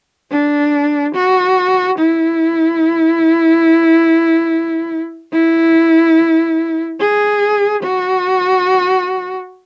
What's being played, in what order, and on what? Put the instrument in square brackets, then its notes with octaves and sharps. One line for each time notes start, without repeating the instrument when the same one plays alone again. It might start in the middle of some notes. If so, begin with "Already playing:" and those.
[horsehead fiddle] D4
F#4
E4
E4
G#4
F#4